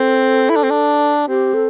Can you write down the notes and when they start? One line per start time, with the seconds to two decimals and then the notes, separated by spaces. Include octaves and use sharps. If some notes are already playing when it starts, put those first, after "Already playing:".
Already playing: C4 A4
0.49 E4
0.56 D4
0.63 C4
0.70 D4
1.28 C4 G4
1.54 A4